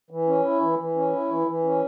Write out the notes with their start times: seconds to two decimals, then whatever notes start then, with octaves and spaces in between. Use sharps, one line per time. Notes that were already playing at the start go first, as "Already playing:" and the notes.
0.10 E3
0.27 C#4
0.44 E4
0.61 E3
0.79 E3
0.96 C#4
1.13 E4
1.31 E3
1.47 E3
1.65 C#4